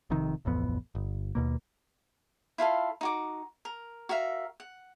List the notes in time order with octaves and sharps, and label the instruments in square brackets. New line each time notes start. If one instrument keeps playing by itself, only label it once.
[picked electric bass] F1 F2 C3 D#3
D1 A1 F2 B3
G1
D#2 B2 A#3
[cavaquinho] E4 F4 A4 F5
D#4 F#4 D6
A#4
F#4 A#4 E5 F5
F#5